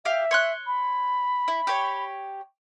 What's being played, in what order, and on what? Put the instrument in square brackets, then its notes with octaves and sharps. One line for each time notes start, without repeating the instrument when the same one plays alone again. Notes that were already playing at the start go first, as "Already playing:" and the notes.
[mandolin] G4 F5 [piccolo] E5
[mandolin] C#5 C6 F#6
[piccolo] B5
[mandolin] E4
G4 C#5